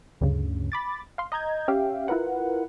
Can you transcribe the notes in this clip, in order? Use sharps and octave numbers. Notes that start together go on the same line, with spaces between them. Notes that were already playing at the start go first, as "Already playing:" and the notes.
D2 G2 C#3
B5 D6 A6
F5 C6
D#5 A#5 G6 G#6
C#4 G4 E5 F5 G5
E4 F4 A#4 B4 F#5